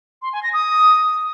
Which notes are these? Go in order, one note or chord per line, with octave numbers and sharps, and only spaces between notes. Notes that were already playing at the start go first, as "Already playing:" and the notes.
C6
G#5
A#6
D#6